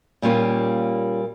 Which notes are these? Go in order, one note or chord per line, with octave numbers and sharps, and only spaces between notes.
A#2 G3 A#3 C#4 F4